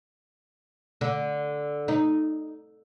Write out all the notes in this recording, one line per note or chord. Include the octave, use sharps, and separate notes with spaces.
D3
D#4